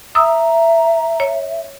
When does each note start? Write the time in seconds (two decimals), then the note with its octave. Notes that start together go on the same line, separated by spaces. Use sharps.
0.15 E5 A#5 D#6 E6
1.20 C#5